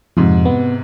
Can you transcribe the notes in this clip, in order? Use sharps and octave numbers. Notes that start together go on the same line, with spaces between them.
F2 G#2 C3
B3